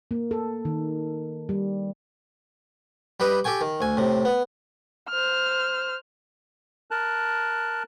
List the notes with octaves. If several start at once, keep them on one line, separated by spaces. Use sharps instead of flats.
A#3
A4
D#3
G3
G3 G4 B4 D#5
G4 A4 G5 G#5 C#6
D#3
D2 G#5
A2 C3
B3
C5 F6
A#4 A5 F#6